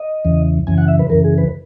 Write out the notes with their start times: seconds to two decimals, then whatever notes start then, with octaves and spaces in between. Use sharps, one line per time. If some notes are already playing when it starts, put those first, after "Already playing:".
Already playing: D#5
0.25 E2 C#3 E3
0.67 F#2 C#3 E3 G#5
0.78 F#5
0.88 E5
0.99 B4
1.10 F#2 C#3 E3 A#4
1.24 G#4
1.38 B4